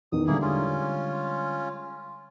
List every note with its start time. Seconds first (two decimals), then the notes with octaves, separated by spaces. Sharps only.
0.12 E2 D#3 D#6
0.27 D3 G3 G#3 A#3 E4 G#4
0.42 C#4 F4